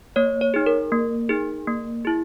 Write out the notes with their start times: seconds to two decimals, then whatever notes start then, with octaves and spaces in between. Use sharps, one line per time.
0.16 A#3 C#5
0.41 C#5
0.54 D#4 G#4
0.66 A#4
0.92 A#3
1.29 D#4 G#4
1.67 A#3
2.05 E4 G#4